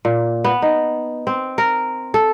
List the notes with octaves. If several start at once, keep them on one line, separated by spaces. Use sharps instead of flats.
A#2
B3
D#4
C4
A#4
A4